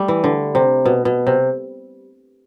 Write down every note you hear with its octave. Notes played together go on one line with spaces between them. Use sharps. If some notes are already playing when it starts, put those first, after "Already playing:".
Already playing: G3 A3
E3
D3
C3
B2
B2
C3